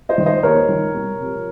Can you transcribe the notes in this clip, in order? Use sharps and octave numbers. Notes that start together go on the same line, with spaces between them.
C5 D#5
D#3
C5 D#5
D#2 A#4 C#5
D#3
C2
C3 F3